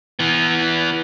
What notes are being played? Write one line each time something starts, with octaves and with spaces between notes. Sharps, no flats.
E3 B3